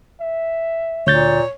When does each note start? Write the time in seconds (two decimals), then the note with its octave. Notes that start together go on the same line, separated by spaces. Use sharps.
0.21 E5
1.07 D2 A#2 C#5 G6 A6